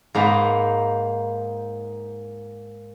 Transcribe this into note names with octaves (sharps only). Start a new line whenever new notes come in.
G#2 A#3 D#4 B4